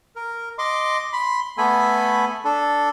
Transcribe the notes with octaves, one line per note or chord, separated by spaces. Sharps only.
A#4
D#5 C6 D6
B5 C6
A3 B3 A4 G#5 B5
D4 A4